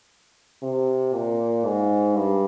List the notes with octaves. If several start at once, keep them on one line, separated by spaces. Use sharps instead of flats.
C3
A#2
G#2
G2